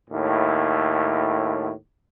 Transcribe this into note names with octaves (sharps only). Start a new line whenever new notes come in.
D#2 A2